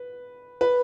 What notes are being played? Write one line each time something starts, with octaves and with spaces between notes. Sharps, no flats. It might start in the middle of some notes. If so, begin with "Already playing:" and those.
Already playing: B4
B4